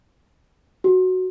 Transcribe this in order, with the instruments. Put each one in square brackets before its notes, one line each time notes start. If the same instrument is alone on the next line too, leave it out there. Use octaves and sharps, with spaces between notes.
[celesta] F#4